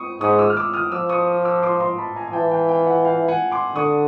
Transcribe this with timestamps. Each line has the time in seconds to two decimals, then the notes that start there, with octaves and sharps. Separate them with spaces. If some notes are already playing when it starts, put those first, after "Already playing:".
Already playing: C#6 D#6
0.21 G#2 C#6 D#6
0.38 D6 E6
0.50 F6
0.56 D6 E6
0.74 D#6 F6
0.92 F3 D6 E6
1.09 C#6 D#6
1.45 D6 E6
1.63 C6 D6
1.80 A#5 C6
1.98 A5 B5
2.16 G#5 A#5
2.27 G#5
2.33 E3 G5 A5
2.51 F5 G5
2.69 F5 G5
2.87 E5 F#5
3.05 F5 G5
3.28 F#5 G#5
3.51 C6 D6
3.76 D3 C#6 D#6